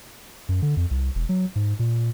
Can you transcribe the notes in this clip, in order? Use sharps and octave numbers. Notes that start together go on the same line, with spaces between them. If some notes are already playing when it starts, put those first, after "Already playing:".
F#2
D3
F2
C2
E1
F#3
G#2
A#2